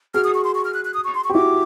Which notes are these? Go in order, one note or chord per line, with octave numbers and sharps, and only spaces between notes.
F#4 G#4 F6
D#6
C#6
C6
C#6
F6
F#6
F#6
D#6
C#6
C6
C#6
G4
E4 F#4 D6